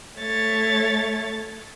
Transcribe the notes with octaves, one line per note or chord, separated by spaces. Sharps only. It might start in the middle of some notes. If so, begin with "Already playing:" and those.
A3 C#5 A6